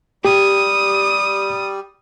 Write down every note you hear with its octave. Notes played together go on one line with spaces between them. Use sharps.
G3 G4 D#6